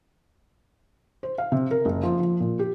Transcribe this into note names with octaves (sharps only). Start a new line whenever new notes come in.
C5
F5
C3
A#4
F#1
F3
F3
A#2
G4